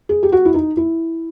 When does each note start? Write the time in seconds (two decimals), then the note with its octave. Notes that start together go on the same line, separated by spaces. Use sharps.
0.09 G#4
0.23 G4
0.32 F#4
0.45 E4
0.54 D#4
0.77 E4